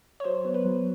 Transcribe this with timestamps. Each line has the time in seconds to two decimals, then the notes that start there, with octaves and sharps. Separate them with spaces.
0.20 C#5
0.24 F#3 C5
0.45 B3
0.54 B4
0.65 F#3